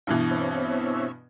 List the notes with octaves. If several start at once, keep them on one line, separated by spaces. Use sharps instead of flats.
G2 B2 E3
C4 C#5 E5